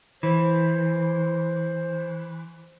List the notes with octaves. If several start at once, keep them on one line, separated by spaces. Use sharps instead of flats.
E3 C5